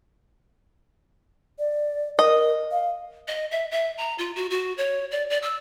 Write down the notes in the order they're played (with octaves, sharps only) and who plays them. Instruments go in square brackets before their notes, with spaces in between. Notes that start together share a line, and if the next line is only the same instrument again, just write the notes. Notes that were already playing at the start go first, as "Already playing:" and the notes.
[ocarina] D5
[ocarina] A#4 [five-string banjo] D#5
[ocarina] F5
[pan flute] D#5
E5
E5
A#5
F4
F#4
F#4
C#5
D5
D5
E6